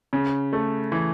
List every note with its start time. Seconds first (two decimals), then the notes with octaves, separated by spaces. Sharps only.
0.13 C#3
0.53 A3
0.92 E3